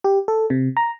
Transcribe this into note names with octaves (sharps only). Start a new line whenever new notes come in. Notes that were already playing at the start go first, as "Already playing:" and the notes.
G4
A4
C3
A#5